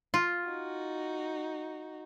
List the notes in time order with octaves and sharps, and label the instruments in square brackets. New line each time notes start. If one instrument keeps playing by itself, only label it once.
[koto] F4
[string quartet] D#4 F#4